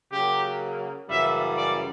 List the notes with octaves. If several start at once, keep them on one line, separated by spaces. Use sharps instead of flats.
C#3 F#3 A#3 G4
F#2 C#3 E3 G3 E5
D5